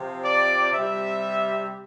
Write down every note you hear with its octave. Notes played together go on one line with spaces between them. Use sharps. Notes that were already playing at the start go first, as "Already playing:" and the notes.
Already playing: C3 F3
D5
C3 G3 E5